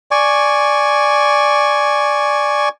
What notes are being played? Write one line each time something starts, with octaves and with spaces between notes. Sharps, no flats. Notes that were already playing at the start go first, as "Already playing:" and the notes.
D5 G#5 C#6